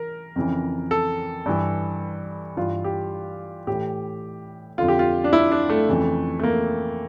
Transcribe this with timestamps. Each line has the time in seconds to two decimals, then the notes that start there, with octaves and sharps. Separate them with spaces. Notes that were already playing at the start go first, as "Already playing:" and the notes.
Already playing: E3 A#4
0.36 F2 C#3 E3
0.91 A4
1.46 G2 E3
2.57 G2 E3 F4
2.84 G4
3.67 A2 E3 G4
4.78 F2 D3 F4
4.88 G4
4.99 F4
5.24 D4
5.33 E4
5.52 D4
5.70 A3
5.89 F2 C#3 E3
6.39 A3
6.43 A#3